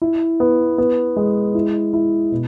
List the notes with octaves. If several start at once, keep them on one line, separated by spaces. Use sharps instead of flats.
E4
B3
B3
G#3
E4
E4
B2